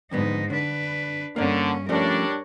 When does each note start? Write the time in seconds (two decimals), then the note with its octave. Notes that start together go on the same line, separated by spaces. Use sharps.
0.11 F2 G#2 D3 B3 D#4
0.50 D3 D4 B4
1.36 G2 D3 A#3 C#4 D5
1.89 F3 G3 A3 C#4 D4 A#4 C#5